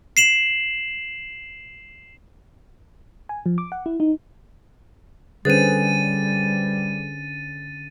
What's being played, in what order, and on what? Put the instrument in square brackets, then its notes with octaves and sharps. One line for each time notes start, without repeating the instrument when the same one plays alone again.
[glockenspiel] C7 E7 F#7
[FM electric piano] G#5
F3
D6
F#5
E4
D#4
[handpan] D3 C#4 [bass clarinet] G3 [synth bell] G#4 B4 C5 [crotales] A6 D#7